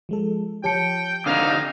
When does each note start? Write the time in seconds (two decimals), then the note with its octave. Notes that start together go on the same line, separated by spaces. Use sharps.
0.09 F3 G#3 A4
0.64 F3 G4 C#5 G5 A5 C#7
1.26 D3 C4 D4 D#4 F5